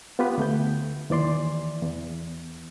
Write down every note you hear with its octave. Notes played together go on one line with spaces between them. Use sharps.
B3 F4 G4 B4
D2 A3 G6
D#2 E3 D5 C6
E2